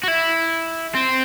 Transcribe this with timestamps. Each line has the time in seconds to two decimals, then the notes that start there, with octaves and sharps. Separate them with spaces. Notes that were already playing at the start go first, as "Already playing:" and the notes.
0.03 F#4
0.08 E4
0.95 C4